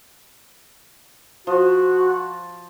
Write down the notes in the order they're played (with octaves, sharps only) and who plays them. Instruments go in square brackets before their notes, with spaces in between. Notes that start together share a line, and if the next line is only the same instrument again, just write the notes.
[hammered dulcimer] F3 [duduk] F#4